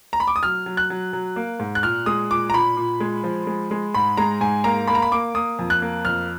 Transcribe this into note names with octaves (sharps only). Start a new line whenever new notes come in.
A#5
B5
D6
D#6
F#3 F6
F#3
F#6
F#3
F#3
A#3
G#2
F#6
A#2 F6
G#3 D#6
A#2 D6
A#5
A#2 B5
A#2
G#3
F3
G#3
G#3
G#2 B5
G#3 A#5
G#2 G#5
A#3 A#5
A#3 B5
A#5
B5
A#3 D6
A#3 D#6
F2
F#6
A#3
F2 F6